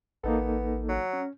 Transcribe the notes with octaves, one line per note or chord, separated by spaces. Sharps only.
A1 A#3 B3 D#4 A4
F#3
C#4